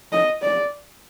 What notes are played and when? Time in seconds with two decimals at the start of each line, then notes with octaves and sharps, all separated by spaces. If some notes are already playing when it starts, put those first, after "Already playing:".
0.13 D#5
0.42 D5